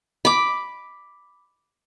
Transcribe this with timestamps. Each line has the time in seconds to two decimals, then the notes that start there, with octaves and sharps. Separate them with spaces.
0.25 B5 D6